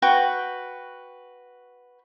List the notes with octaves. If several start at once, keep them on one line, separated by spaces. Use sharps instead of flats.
F#4 B4 G5 C#6